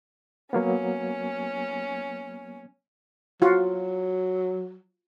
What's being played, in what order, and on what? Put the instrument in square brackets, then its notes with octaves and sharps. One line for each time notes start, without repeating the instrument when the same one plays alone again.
[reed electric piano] F#3 A#3 B3 [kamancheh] C#4
[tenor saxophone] F#3 [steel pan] F4 F#4